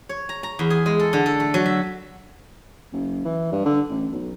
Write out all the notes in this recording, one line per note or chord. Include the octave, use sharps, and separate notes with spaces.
C#5
A#5
A#5
E2
G#4
G#3
A4
D3
A4
A3
F#3
E5
F#1
E3
G2
D3
A1
B1